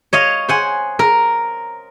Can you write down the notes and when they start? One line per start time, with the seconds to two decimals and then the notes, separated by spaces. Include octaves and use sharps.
0.13 C#5 D#5 F5
0.49 C5 F#5 G#5
0.99 A#4